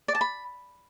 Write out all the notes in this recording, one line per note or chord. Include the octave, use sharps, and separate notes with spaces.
D5
A5
B5